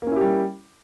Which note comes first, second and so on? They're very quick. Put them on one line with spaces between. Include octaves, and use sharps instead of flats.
A#3 C#4 E4 G4 G3